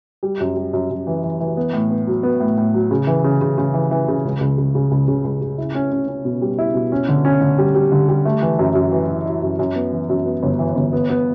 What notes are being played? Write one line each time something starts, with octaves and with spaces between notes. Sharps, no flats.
G3
F#2
G3
F#2
F#2
E3
E3
E3
B3
A2
B3
F#3
B3
A2
A2
F#3
C#3
E3
C#3
C#3
C#3
E3
E3
C#3
C#2
C#2
C#2
C#3
C#2
C#3
C#2
C#3
E4
C#4
C#4
C#4
B2
G3
E4
B2
C#4
D3
C#4
D3
G3
G3
D3
G3
A3
E3
F#2
F#2
E3
E4
E4
F#2
F#2
B3
E3
F#2
B3
G1
E3
G1
B3
B3